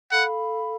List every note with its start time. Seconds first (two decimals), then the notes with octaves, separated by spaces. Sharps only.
0.11 A4 F5 F#5 B5